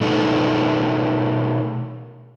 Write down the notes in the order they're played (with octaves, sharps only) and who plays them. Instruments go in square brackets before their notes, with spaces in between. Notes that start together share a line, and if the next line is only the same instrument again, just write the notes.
[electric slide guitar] B2 A3 D4 D#4